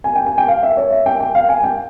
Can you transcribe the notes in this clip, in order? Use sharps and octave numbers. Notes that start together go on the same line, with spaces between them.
G#5
G5
G#5
G5
F5
E5
C#5
E5
G5
G5
F5
G#5
G5